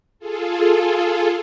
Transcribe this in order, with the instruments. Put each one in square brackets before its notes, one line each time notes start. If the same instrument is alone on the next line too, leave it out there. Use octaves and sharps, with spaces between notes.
[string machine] F4 G#4 A4